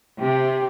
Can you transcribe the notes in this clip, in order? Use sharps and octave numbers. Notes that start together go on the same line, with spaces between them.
C3 G4